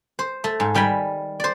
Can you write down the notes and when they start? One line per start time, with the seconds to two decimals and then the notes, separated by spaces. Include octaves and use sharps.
0.19 C5
0.44 A3
0.60 G#2
0.75 D#3 G3 G5 G#5 B5
1.40 C5 D5